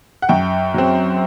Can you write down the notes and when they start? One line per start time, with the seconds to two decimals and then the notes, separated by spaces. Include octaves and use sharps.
0.22 F#5
0.29 F#2 G5
0.74 F#3 C4